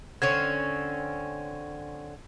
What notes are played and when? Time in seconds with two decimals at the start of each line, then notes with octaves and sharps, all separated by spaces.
0.22 D3 C4 C#4 G#6